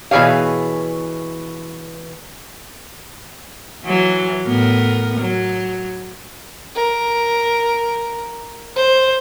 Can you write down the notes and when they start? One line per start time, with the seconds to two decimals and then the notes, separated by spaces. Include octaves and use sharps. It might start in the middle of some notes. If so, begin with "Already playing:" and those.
0.11 B2 E3 G#4 C#5 F5
3.85 E3 F#3
4.46 A2 B3 A#4
5.21 F#3
6.75 A#4
8.76 C5